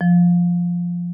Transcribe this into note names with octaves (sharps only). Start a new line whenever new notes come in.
F3